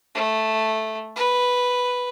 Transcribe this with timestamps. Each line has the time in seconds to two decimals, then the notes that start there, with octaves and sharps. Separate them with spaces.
0.15 A3
1.16 B4